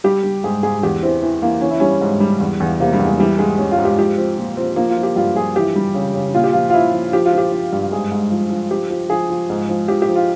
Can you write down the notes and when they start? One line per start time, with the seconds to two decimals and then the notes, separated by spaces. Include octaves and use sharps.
0.04 G3 G4
0.23 G3
0.44 G#2 G#4
0.63 G#2 G#4
0.83 E2 G4
1.02 E3 C4
1.22 E3
1.42 E3 A#3
1.61 E3 C#4
1.70 E4
1.80 G3 C#4
2.01 G#2
2.20 G3
2.40 E2
2.60 E2
2.80 C3 A#3
2.93 G3
2.99 E2
3.06 G#3
3.19 E3 G3
3.39 G#2 G#3
3.58 G3 C#4
3.72 F4
3.78 G#2
3.85 G4
3.98 F3 G4
4.17 F3 C4
4.38 A#2
4.57 F3 C4
4.76 F3 A#3
4.90 F4
4.97 F3
5.03 G4
5.16 G2 F4
5.35 F3 G#4
5.56 E3 G4
5.76 G3
5.94 C#3
6.14 C#3
6.34 A#2 F4
6.44 G4
6.53 F3 F4
6.70 F4
6.73 F3 E4
6.94 F3
7.13 F3 G4
7.26 F4
7.33 F3
7.38 G4
7.52 F3
7.73 G2
7.92 G#2 G#4
8.12 G#2
8.32 F3
8.50 F3
8.71 F3 G4
8.90 F3
9.10 F3 G#4
9.30 F3
9.50 G#2
9.69 F3
9.88 F3 G4
10.02 G4
10.09 F3
10.16 F4